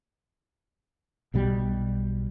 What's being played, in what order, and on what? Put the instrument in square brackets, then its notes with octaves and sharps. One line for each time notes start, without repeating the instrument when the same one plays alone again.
[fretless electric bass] B1 B2 G3